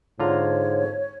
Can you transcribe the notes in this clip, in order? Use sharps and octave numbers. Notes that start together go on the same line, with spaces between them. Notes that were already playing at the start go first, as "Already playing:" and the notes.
G#2 D3 F4 C#5 A#5